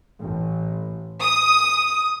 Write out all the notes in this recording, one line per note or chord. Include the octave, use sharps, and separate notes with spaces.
A1
D#6